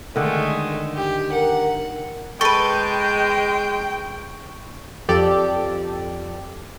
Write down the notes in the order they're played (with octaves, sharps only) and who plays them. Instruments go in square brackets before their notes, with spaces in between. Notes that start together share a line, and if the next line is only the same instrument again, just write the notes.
[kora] D3 D#3 [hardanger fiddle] G#3 A3
[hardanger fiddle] G4
[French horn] A#4 [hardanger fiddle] F#5
[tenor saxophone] G#3 [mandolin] A4 B4 [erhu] G5 [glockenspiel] C#6
[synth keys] F2 G4 A4 D5